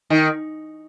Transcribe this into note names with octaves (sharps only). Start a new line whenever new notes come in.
D#3